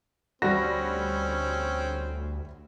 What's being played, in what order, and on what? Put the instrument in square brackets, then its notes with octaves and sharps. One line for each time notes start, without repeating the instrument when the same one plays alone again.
[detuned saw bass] D2 [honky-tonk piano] G3 A#6 [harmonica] C4 C#4 [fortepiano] F#4